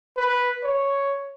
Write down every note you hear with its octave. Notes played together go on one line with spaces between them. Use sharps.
B4
C#5